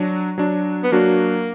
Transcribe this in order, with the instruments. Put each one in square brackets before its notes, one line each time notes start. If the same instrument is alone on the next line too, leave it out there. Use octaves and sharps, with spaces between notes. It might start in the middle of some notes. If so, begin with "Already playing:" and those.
Already playing: [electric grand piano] F#3 D4 F#4
F#3 D4 F#4
[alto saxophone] B3
[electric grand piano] F#3 D4 F#4 [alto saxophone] A#3